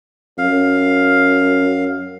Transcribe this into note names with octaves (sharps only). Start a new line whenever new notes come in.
F#2 F5